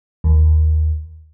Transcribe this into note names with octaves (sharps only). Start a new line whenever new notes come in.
D#2